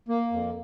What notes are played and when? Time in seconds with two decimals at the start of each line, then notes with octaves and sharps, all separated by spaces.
0.09 A#3
0.32 F2